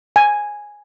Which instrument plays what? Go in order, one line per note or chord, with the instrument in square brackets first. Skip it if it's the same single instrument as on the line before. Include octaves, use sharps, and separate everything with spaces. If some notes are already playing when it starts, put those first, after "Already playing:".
[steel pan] G#5